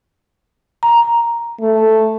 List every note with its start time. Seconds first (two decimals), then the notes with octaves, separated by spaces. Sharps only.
0.83 A#5
1.61 A3